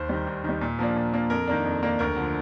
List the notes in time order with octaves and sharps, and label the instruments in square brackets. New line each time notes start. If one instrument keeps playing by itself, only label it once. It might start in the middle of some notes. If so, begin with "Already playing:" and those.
Already playing: [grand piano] D#2 C5
D#3 G3
D#2
D#3 G3
A#2
F3 A#3 D4
A#2
F3 A#3 D4
F2 A#4
D#3 A#3 D4
F2
D#3 A#3 D4
D2 A#4
D3 F3